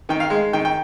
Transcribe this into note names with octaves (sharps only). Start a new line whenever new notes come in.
D#3 G5
F5
G#3
D#3 G5
G5